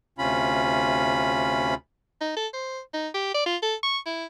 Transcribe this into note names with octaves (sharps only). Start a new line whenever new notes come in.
D2 C3 C#4 F4 B5
D#4
A4
C5
D#4
G4
D5
F4
A4
C#6
E4